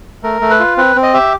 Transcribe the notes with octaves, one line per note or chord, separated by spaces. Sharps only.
A3 A#4
A3
B4
F4
C4 B4
C4
D#5
G4 E5